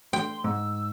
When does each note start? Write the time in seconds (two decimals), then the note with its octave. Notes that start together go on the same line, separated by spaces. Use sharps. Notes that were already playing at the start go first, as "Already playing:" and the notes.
0.13 G5 C6
0.44 G#2 E6